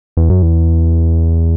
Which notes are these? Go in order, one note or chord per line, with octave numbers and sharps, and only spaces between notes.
E2
F#2
E2